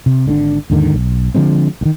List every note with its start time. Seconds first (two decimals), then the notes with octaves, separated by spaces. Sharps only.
0.06 C3
0.26 G#1 D3 C4 D4
0.70 D#2 G#2 D3 D#3
0.94 B1
1.35 D3 F3 G#3 C4
1.81 D2 D#3